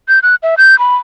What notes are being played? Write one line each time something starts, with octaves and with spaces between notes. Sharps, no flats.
G6
F#6
E5
G6
B5